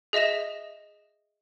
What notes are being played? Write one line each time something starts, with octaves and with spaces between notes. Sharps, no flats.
G#4 D#5 E5 A#6 E7